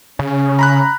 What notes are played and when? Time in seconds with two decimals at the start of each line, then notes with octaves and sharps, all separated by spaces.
0.19 C#3 C#4
0.59 A#5 B5 F#6